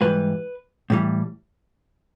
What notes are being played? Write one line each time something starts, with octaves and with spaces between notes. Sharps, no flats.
G#2 E3 G3 B4
A2 E3 G3